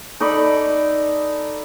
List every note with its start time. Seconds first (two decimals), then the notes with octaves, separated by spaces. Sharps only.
0.20 D#4 A4 D5 B5